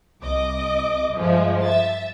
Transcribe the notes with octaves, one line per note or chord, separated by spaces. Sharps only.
C2 D#5 D6
G2 F3 G#3 A3
E5 A6